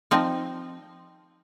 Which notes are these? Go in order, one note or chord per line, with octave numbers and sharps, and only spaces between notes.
F3 C4 D#4